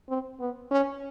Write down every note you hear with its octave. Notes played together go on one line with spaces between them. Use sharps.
C4
B3
C#4